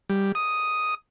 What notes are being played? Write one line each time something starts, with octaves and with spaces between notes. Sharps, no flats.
G3
D#6